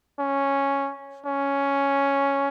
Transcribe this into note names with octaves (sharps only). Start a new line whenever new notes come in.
C#4
C#4